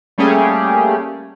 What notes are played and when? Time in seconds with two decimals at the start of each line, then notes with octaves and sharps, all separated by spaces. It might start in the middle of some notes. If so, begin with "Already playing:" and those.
0.18 G3 A3 A#3 C#4 G4 G#4